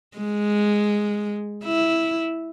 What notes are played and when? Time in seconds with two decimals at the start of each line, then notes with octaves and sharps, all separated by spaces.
0.17 G#3
1.65 E4